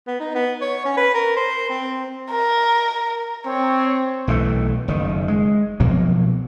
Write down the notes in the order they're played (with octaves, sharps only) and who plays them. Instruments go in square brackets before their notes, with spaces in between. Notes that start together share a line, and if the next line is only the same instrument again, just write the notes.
[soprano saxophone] B3
D#4
B3
C#5
C#4
B4
A#4
C5
C4
[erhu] A#4
[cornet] C4 [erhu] C#5
[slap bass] B1 E3 F3 A3
F#1 D#3
G#3
B2 F3 F#3 A#3